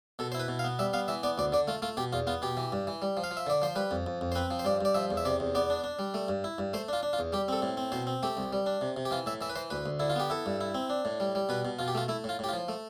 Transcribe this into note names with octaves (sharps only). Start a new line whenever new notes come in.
B2 A4
C5
E4 B4
B2
F5
B3
G3 E5
B3 F5
E3 E5
B3 D5
D2 D5
D3 D5
A3 F4
A3 F4
B2 G4
E2 F4
B3 F4
B2 G4
E3
G2
E3
G3
F3
F5
F3
E5
D3 D5
F3 C5
G3 B4
F2
F2
F2
C5
C4 B4
F3
C5
G2 D5
G2 D5
F3 E5
E2
E5
C3 D5
E2
B3 D5
D4
D4
G3
A3
G2
E4
G2
A3 C5
D4 F4
D4
F4
E2
G3 G4
C4 A4
A2
C4
B2 C5
C4
A3 G4
C2
G3
D4
C3
C3
G4
E3 F4
A2 E5
E3 E5
B4
E3 C5
D2 B4
D2
D3 E4
F4
B3 G4
E4 A4
G2
E4
C4
D4
A2
G3
G3
B2 B4
B2
B2 F4
G4
A3 F4
A3 E4
A2 F4
A2 G4
F4
F3
A3